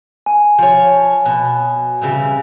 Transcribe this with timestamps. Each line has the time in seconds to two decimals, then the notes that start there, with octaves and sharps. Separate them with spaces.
0.26 G#5
0.59 F3 C#5
1.26 B2
2.01 C#3 E3 G3